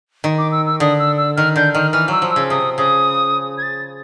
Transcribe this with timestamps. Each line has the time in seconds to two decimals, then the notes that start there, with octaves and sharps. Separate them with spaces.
0.24 D#3
0.38 D6
0.52 E6
0.66 E6
0.80 D3 D#6
0.99 E6
1.17 E6
1.36 D#3 F6
1.56 D3 G6
1.74 D#3 F6
1.93 E3 F6
2.08 F#3 E6
2.22 F3
2.30 E6
2.36 C#3
2.50 C3 D#6
2.78 C#3 D#6
3.58 G#6
3.62 A6